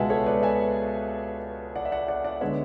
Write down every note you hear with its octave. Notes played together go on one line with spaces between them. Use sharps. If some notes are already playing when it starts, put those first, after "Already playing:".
Already playing: C#2 B2 G#3 B3 E5 F#5 G#5 A5
A4 C#5
B4 D5
E5 G#5
D5 F#5
E5
D5 F#5
D5 F#5
D5 F#5
D3 G#3 B3 C#5 E5